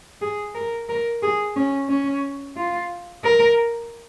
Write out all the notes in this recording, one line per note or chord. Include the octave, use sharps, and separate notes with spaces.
G#4
A#4
A#4
G#4
C#4
C#4
F4
A#4